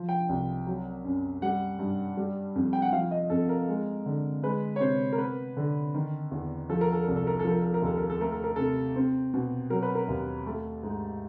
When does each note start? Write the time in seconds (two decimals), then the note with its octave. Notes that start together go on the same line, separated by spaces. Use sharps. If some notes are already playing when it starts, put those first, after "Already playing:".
Already playing: F3
0.09 G5
0.29 C2
0.67 F#3
1.05 F#2
1.42 G3 F#5
1.79 G2
2.17 G3
2.56 F2
2.73 G5
2.82 F#5
2.92 F3 F5
3.11 D#5
3.30 F2 A4
3.49 A#4
3.68 G#3
4.06 D3
4.43 G#3 B4
4.76 C#5
4.80 C3 C5
5.13 A#4
5.18 B3 B4
5.57 D3
5.94 D#3
6.31 E2
6.69 F3 A4
6.81 A#4
6.92 A4
7.04 C2 A#4
7.16 A4
7.27 A#4
7.39 A4
7.44 F3
7.51 A#4
7.62 A4
7.74 A#4
7.82 D#2 A4
7.98 A#4
8.10 A4
8.21 A3 A#4
8.32 A4
8.44 A#4
8.56 C3 A4
8.96 C4
9.34 B2
9.70 F#3 A#4
9.83 B4
9.95 A#4
10.08 D#2
10.47 A3
10.83 G#2